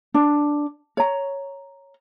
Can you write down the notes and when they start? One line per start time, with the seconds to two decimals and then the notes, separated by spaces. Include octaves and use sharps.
0.14 D4
0.97 C#5 A#5